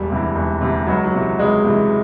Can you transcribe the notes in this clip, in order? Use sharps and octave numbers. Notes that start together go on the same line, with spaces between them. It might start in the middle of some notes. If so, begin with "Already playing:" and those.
Already playing: E1 G3
D2 C3 E3
E1
D2 C3 E3
C#2 F#3
F#3
C3 E3
C#2 G#3
C3 E3